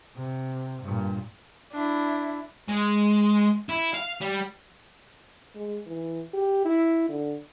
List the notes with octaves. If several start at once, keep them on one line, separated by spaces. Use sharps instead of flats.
C3
G2 A#2
D4 E4
G#3
E4
F5
G3
G#3
E3
G4
E4
D3